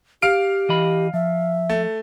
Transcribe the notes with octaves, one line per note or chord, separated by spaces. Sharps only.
G4 F5 F6 D7
E3 D#5 B5
F3 E5
A3